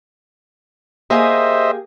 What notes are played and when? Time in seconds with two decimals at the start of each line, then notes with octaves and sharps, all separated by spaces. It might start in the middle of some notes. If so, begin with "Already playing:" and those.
1.10 A#3 G4 G#4 C5 D#5 E5